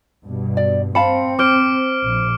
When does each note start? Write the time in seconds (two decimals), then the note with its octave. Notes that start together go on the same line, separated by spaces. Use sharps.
0.22 G2 B2
0.57 D5
0.95 C4 F5 A5 B5 C#7
1.39 C5 D6 F6 D7
2.04 A#1